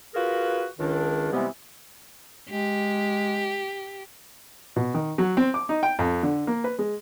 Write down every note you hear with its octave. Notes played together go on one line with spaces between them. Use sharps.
F4 F#4 G#4 A#4 B4
C#2 D#3 D4
C3 E3 G3 G#3 B3
G#3 G4
B2
D#3
F#3
C4
D6
D#4
G5
F2
D3
A#3
B4
G#3